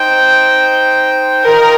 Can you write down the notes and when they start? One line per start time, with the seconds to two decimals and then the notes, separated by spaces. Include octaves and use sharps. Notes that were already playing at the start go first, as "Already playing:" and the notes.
Already playing: D#4 C5 G5
1.45 F4 A#4 D#5 G5